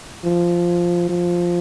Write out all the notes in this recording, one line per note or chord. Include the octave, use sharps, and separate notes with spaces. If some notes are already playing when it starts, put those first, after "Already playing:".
F3
F3